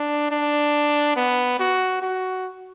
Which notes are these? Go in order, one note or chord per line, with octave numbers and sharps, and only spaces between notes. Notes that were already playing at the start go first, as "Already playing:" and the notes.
Already playing: D4
D4
B3
F#4
F#4